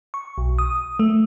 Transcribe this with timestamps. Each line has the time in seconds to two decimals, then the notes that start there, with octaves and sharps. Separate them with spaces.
0.14 C#6
0.38 B1
0.59 D#6
0.99 A3